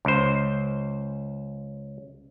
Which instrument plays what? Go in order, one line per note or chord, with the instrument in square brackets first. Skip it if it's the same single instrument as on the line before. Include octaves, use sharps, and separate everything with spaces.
[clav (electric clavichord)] C#2 C5